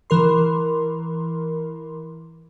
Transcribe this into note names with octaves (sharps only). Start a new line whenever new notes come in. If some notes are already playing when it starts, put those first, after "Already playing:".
E3 A#4 C6